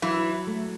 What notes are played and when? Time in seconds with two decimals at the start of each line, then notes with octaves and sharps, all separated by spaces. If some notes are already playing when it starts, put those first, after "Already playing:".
0.02 E3 F#3 E4
0.47 A3